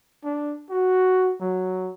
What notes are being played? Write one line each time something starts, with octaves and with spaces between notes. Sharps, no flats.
D4
F#4
F#3